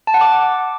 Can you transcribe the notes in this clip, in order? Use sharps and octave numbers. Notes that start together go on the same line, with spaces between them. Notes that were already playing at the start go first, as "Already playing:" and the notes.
A5
F#5
D6